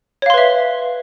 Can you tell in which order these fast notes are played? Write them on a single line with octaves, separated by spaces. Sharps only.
C#5 F5 C6 B4 E5